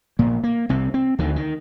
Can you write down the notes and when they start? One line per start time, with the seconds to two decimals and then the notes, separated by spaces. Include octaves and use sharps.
0.19 A#1 A#2 A#3
0.44 A#3
0.69 C2 C3 C4
0.94 C4
1.19 D2 D3 D#3
1.36 D#3